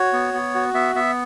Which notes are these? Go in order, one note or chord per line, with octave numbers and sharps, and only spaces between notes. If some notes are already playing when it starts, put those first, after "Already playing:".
Already playing: F#4 C#5
B3
B3
F#4
B3 E5
B3 E5